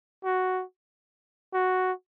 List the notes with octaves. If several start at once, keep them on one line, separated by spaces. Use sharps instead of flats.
F#4
F#4